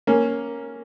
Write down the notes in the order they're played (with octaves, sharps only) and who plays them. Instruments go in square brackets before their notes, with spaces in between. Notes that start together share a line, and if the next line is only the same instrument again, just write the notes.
[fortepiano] A#3 C#4